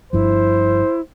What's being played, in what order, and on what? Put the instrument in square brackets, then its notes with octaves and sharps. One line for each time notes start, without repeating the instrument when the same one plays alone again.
[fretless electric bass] G1 G2 F3 [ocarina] E4 [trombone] C5